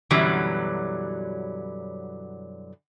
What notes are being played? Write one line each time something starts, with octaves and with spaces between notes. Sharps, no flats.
F#2 B2 D3 E3 F#3 G3